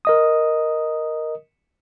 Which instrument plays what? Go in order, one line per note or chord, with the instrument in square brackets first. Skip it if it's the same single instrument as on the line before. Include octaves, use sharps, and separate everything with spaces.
[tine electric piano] A#4 D#5 D#6